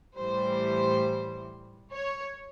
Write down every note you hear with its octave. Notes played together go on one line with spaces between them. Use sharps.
A2 E3 G3 C5
C#5